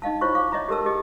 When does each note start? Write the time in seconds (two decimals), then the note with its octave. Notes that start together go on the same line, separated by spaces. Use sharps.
0.02 D#4 D#5 F5 A5
0.21 E4 F4 C5 C#5 C#6
0.35 F5 C#6 D6
0.52 C#5 D#5 E5 A#5
0.69 G4 A4 A#4 A5 E6
0.86 G4 G#4 D#5